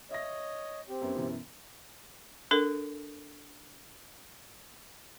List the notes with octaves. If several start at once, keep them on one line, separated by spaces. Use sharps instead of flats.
C#5 D#5 E5 A#6
C4 G4
F#2 B3 C#4
F#2 B2 E3
D4 A4 A#4